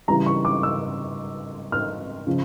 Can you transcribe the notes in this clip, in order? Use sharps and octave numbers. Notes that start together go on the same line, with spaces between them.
C#3 E3 G3 A#5
C#6
D6
E6
F6
C#3 F3